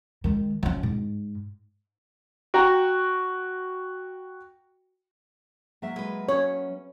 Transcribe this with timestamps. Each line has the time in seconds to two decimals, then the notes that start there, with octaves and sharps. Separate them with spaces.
0.24 D#3 G#3
0.63 F3 C#4
0.83 G#2
2.54 F#4 G5 A#5
5.82 F#3 A#3 E5
5.96 G#3 B4
6.29 C#4 C#5